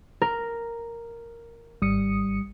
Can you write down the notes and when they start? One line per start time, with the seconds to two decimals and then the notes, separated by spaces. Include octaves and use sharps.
0.22 A#4
1.82 G#1 G3 D#6 C#7